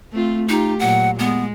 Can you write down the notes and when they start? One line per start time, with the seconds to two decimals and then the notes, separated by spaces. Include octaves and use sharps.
0.12 A3 C4 F4
0.49 D#4 F4 G4
0.79 A#2 F#3 F#5
1.19 G#3 B3